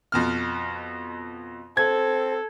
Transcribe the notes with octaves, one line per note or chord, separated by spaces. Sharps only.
F2 B2 F6
C4 A4 G#6